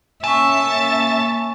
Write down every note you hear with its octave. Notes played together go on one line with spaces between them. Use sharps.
A#3 C#4 E5 G#5 A5 C#6